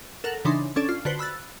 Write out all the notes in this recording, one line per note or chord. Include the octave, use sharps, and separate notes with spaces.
A4 A#4 F#5
C#3 E3 D4 D#4 C6
C#4 D4 A4 D5
F4
D3 F#4 B4 C5
B5 E6 F#6 A6